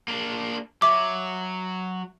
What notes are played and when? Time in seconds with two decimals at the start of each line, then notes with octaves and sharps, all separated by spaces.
0.08 A#3 D4
0.82 F#3 E5 D6